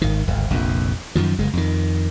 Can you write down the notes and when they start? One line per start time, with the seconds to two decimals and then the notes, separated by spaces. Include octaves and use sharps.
0.02 G#1 D#3
0.28 D1 G#1
0.50 F1 A#1 F2
1.15 F#2 D#3 F3
1.38 F#1 G#3
1.53 F2 D#3